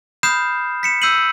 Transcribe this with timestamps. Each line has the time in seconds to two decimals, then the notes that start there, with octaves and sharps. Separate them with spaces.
0.23 B5 D#6 F6 G6 C7 E7
0.83 B6 C#7 E7
1.02 E6 G6 B6 C7 D#7 F#7